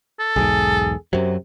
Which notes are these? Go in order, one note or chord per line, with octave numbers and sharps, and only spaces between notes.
A4
B1 E2 G#2 G#4
F#2 C3 F#3